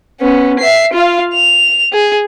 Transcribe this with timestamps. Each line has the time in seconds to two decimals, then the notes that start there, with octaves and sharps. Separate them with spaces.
0.21 B3 C#4
0.59 E5 C7
0.93 F4 F5
1.34 F7
1.93 G#4